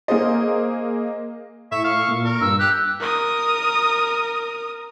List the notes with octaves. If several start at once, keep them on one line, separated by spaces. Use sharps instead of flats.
A#3 G#4 C5 D#5
A2 E5 C#6
F5 C#6
A#2
A#4
G2 E6
G4 F#6
A#4 D#6